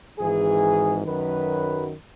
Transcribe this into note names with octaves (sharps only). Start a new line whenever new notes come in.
G#1 G#2 E3 G#4
F#2 D#3 F#3 B4